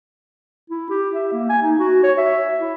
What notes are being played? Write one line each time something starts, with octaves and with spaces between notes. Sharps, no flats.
E4
G4
E5
A#3
G#5
D#4
F#4
C#5
E5
E4